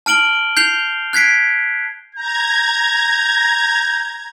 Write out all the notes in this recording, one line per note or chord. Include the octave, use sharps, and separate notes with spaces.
A5 F6 D7 F#7 G7
G6 C7 F7 G7
F#6 G#6 B6 C7 D7
A#5 G6 G#6